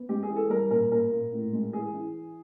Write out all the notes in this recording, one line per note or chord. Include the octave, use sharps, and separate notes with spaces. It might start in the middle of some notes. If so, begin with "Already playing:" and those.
Already playing: B3
G#3 G4
G#4
E3
A4
G3 A#4
A#2 A#4
A#2 A#4
A#2
A2
G#3
E3 G#4
E3